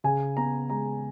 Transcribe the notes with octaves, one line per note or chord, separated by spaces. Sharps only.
C#3 G#5
B3 A#5
G#3 A#5